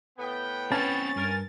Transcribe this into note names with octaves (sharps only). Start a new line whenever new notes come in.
A2 B3 G5
C4 C#4 B4 A6
G2 A#4 G#5